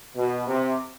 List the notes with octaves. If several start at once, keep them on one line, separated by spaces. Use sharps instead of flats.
B2
C3